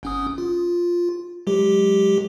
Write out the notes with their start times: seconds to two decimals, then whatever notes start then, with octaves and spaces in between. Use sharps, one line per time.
0.03 G1 C#4 D#6
0.38 F4
1.47 F#3 G#3 G4